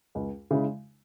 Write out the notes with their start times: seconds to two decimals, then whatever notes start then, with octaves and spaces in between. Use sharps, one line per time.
0.15 C#2
0.51 C#3 G#3 E4